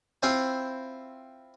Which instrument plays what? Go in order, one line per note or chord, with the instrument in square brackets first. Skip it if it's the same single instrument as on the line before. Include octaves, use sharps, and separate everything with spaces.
[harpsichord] C4 E4 F4 C5 G5 G#5